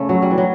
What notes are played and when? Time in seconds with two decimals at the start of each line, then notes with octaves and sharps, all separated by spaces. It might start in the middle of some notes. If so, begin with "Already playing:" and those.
Already playing: C#3 A3
0.09 F#3
0.22 G3
0.31 E3
0.38 F#3